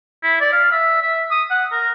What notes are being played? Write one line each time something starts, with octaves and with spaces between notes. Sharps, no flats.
E4
D5
F5
E5
E5
D#6
F#5
A#4